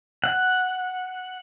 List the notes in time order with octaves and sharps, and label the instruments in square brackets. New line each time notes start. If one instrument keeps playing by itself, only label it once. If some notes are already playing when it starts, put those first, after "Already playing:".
[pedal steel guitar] F#5